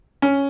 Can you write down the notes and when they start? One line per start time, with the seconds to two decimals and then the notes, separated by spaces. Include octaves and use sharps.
0.22 C#4